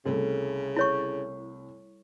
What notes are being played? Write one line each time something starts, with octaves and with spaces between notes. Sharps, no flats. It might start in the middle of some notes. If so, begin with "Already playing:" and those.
C2 C#3 G3 A3 A4
E4 C#5 C#6